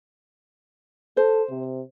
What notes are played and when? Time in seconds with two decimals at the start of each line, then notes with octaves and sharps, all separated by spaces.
1.17 A4 C5
1.50 C3